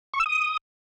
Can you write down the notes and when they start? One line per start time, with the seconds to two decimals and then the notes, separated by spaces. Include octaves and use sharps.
0.14 C#6
0.20 E6
0.26 D#6